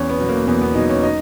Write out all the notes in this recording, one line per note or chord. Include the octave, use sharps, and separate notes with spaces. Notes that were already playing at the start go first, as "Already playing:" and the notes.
Already playing: E2 C#4
B3
B2 F#3
A#3
E2 B3
B3
B2 F#3 D#4
C#4
D#4